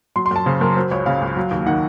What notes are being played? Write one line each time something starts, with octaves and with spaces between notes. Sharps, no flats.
F#3 C6
C6
F#2 A5
C#3 C5
F#2 A#4
F#3 C5
C#2 C#5
C#3 F5
C#2
F#3
D#2
D#3 F#5